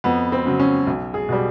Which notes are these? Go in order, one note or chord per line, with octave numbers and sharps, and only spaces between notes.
F2 B3
C4
C#3 F#3
C#4
B1
G#4
B2 G3